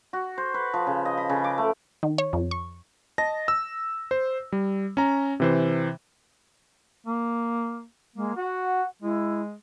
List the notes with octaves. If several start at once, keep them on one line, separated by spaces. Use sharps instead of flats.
F#4
C5
B4
F3
C#3
D#5
B5
C#3
D6
A3
D#3
C#5
F2
C#6
D#5 A5 A#6
E6
C5
G3
C#4 A#5
C3 E3 C5
A#3
G#3 A#3
F#4 F#5
G#3 E4